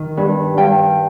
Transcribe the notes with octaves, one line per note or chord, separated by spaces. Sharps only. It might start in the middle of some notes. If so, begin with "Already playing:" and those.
Already playing: D#3
G2
G2 G5